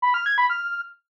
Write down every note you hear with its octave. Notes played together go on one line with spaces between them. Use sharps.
B5
F6
G#6
B5
F6